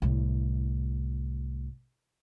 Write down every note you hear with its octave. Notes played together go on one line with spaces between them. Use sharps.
C2 A2